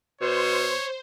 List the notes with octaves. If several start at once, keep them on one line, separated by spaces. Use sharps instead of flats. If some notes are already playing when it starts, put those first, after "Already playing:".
B2 C5 C#5